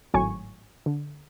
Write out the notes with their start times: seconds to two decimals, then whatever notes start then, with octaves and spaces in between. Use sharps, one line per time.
0.14 G#1 A2 F#3 G#5 C#6
0.86 D3